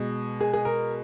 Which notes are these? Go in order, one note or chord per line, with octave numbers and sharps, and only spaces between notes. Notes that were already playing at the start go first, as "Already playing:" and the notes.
Already playing: B2 G#3
G#4
G#4
A#4